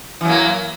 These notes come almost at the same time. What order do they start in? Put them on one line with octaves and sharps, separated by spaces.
E3 F#3 A#3